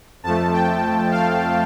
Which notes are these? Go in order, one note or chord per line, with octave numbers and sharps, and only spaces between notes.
F2 F3 A3 A5
G5
F5